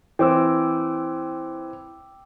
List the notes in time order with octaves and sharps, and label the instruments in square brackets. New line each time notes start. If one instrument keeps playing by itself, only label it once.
[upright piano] E3 C4 [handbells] G5 D6 E6